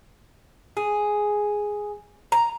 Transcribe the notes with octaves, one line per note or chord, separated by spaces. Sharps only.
G#4
A#5